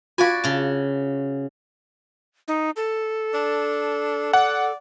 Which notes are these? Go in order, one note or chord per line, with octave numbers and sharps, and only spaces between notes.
F4 F#4 D5 F5 G#5
C#3 A5
D#4
A4
D4
D5 F#5